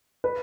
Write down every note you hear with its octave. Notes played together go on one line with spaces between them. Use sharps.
B4